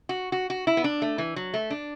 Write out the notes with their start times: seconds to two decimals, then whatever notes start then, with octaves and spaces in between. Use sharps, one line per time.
0.09 F#4
0.32 F#4
0.50 F#4
0.67 E4
0.77 B3
0.84 D4
1.02 A3
1.18 E3
1.36 F#3
1.54 A3
1.70 D4